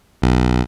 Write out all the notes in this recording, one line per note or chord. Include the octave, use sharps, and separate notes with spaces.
B1